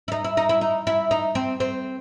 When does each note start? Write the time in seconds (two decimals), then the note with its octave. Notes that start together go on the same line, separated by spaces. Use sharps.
0.08 E4
0.12 D#4
0.24 E4
0.37 D#4
0.49 E4
0.61 D#4
0.87 E4
1.11 D#4
1.35 C4
1.60 C4